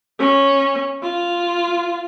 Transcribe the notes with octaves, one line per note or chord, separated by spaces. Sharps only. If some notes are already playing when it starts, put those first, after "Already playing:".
C#4
F4